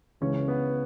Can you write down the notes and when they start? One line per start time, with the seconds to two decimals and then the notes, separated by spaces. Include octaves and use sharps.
0.21 C#2 C#3 E3 C#4
0.48 B3